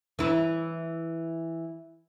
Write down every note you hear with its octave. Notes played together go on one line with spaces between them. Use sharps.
E3 E4